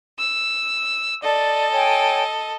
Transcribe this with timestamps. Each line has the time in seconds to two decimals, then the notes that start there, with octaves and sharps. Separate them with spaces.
0.18 E6
1.22 A4 D5 D#5
1.72 C#5 G5 G#5